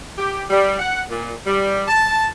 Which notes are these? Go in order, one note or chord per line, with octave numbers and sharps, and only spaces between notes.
G4
G3
F#5
A#2
G3
A5